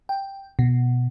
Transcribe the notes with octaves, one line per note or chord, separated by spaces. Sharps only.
G5
B2